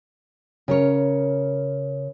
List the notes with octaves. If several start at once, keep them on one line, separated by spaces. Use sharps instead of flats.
C#3 A#4 C#5